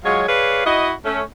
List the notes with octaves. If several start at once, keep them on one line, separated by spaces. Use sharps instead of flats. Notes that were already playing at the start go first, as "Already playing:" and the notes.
F#3 G#3 F4 C#5
G#4 B4 C#5 D5 F5
E4 F#4 D#5
A3 C#4